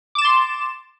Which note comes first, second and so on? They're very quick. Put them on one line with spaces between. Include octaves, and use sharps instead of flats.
D6 E7 A6 C6